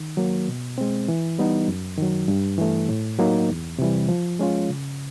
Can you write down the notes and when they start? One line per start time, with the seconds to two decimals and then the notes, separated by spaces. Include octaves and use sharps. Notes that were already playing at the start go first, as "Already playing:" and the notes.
Already playing: D#3
0.17 F#3 A#3
0.48 B2
0.78 G#3 C4
1.08 E3
1.39 G3 B3 D#4
1.68 F#2
1.98 D#3 F#3
2.28 G2
2.58 E3 A3
2.89 A2
3.19 F#3 A#3 D#4
3.49 E2
3.79 C3 E3 G3
4.09 F3
4.39 G#3 C#4 F4
4.69 C#3